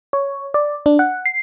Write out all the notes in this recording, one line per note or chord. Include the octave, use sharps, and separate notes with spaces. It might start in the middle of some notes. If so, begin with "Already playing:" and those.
C#5
D5
D4
F#5
C7